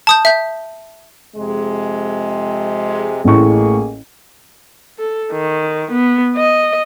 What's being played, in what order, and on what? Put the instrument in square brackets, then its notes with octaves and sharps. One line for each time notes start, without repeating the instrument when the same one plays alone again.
[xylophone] A5 D#6 G6
E5 G6
[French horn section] F2 C3 G#3
[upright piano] A1 A2 C#6 [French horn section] A#3 G#4
[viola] A4
D#3
B3
D#5